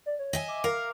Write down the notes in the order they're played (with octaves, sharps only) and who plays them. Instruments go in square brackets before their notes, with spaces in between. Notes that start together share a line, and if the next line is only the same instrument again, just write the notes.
[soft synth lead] D5
C#5
[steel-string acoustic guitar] D#5 E5 G#5
[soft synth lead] D6
[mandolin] A#4 [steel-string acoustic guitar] F5